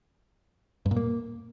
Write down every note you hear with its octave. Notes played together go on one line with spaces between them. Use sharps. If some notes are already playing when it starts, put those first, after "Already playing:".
G2
A#2
A#3